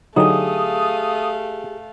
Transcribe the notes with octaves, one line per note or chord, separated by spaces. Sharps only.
D3 F#3 A3 D#4 G4 G#4 F5 D#6